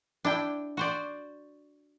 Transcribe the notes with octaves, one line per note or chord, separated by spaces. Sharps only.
D4 E4 G5
F#4 C5 D5